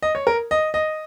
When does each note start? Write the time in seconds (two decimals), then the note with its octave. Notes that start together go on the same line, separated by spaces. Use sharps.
0.03 D#5
0.15 C#5
0.27 A#4
0.51 D#5
0.74 D#5